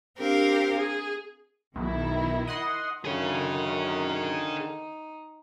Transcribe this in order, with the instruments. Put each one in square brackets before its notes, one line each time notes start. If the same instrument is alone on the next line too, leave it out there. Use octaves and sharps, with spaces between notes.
[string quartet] C4 D4 G4 A#4 F5
G#4
[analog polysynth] B1 [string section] D#3 E4
[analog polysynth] D#5 F#5 C6
[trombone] F#2 [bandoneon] D3 D#3 [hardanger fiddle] D#4 [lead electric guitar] G#4 C#5